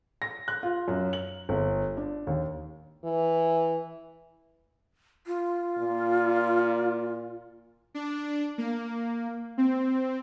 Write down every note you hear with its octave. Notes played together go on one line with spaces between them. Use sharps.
A#6
F#6
F4
F#2
F#7
G1
D4
D#2
E3
F4
A#2
D4
A#3
C4